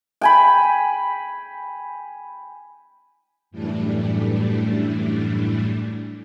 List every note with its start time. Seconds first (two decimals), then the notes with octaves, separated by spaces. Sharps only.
0.21 G5 G#5 B5
3.51 F#2 A2 E3 G3 A3 D4